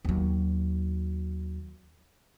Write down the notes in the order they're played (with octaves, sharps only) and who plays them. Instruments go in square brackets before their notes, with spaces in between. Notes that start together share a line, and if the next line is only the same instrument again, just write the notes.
[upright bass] D#2 F#3